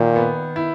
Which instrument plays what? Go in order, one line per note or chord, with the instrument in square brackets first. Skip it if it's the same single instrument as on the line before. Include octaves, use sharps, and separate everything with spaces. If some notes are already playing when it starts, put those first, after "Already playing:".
Already playing: [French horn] A#2 [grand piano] D#3
[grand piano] B3
E4